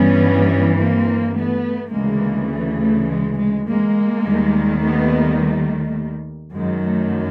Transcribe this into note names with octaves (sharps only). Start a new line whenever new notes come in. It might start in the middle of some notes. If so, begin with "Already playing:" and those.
Already playing: G2 E3 G3 B3 C#4
A#3 C4
A3 B3
D2 C#3 E3 G#3 A#3
A3
A3
G#3
G#3
G#3 A#3
D#2 D#3 G3
A3 B3
A3
F#2 D#3 F#3 G#3
A3